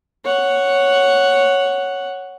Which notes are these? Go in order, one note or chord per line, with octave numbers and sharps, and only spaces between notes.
C#5 F#5